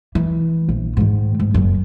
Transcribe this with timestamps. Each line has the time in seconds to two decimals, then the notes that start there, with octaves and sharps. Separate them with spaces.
0.15 E3
0.69 A#1
0.97 G#2 D#3
1.40 G#2
1.54 F#1 F#2